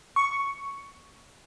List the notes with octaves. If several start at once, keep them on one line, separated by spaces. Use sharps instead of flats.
C#6